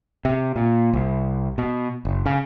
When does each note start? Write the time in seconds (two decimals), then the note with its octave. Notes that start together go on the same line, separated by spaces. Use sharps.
0.25 C3
0.56 A#2
0.93 C2
1.58 B2
2.05 F#1
2.26 C#3